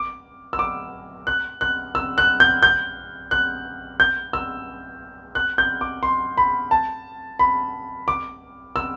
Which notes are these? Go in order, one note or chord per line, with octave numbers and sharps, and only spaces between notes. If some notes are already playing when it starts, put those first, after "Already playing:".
Already playing: D6
E6
D6
F#6
F#6
E6
F#6
G6
G6
F#6
G6
E6
F#6
G6
D6
C6
B5
A5
B5
D6
E6